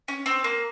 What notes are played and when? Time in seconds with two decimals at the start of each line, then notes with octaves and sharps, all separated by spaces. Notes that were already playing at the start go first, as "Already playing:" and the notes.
0.08 C#4
0.26 C4
0.44 A#3